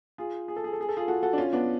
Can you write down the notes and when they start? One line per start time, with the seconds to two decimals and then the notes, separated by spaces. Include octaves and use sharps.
0.18 F4 G#4
0.48 G#4
0.56 A4
0.64 G#4
0.73 A4
0.81 G#4
0.89 A4
0.97 F4 G#4
1.08 F#4 A4
1.23 F#4 A4
1.33 D4
1.38 C#4 F4
1.53 B3 D4